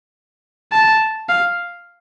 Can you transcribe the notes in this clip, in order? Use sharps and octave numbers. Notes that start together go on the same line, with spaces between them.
A5
F5